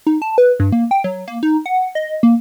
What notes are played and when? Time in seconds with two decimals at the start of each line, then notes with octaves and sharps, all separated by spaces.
0.07 D#4
0.22 A5
0.38 B4
0.60 G2
0.72 A#3
0.91 G5
1.04 F#3
1.28 A#3
1.43 D#4
1.66 F#5
1.95 D#5
2.23 A#3